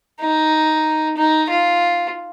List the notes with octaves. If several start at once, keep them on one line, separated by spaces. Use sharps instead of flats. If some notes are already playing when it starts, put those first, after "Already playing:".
D#4
D#4
F4